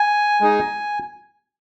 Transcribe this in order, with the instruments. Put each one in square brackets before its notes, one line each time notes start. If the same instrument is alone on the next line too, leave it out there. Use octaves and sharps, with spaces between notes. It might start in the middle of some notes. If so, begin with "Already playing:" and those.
Already playing: [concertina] G#5
G#3 D#4 G#4